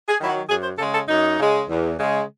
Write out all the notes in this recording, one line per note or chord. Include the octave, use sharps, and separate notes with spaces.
G#4
D#3 F#3 E4
F#4
F#2 G#4
C5
C#3 G#3 A4
A4
F#2 D#4
C#3 G#3
E2
C#3 G#3